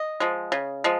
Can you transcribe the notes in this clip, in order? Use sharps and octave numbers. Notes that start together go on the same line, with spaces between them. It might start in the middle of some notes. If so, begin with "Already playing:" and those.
Already playing: D#5
F3 G#3
C#3
F3 G#3